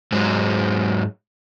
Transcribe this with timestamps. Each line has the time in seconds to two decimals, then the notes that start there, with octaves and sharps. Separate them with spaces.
0.12 G#2 F#3 G#3